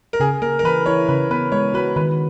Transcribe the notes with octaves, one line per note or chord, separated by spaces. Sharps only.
A#4
C#3 G#4
A#3 A#4
A#4
E3 B4
E4 C#5
C#3 B4
B3 B4
G#3 C#5
F#4 B4
D#3 B4